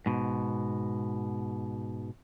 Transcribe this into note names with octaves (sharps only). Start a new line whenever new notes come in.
G#2 B2